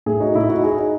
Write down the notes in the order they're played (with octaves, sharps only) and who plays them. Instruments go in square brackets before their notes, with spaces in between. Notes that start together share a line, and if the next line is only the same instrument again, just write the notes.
[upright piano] A2 G#4
D#4 F#4
A2 E4
D#4 F#4
D#4 G#4
D#4